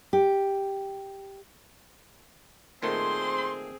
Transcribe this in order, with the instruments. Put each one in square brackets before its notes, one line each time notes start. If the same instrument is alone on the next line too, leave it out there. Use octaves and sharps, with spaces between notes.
[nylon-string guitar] G4
[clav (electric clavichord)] A#2 D#3 A3 [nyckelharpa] C4 G#4 [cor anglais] C5 [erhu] C6